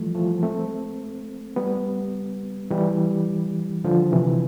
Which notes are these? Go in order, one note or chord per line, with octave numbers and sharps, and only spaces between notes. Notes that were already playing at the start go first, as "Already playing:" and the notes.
Already playing: E3 F3 G3 A3
F3 A3
A3 C4
G3 B3
E3 G3
D3 F3
C3 E3